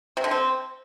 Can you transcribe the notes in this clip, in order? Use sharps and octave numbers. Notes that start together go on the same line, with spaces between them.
C3
D3
C4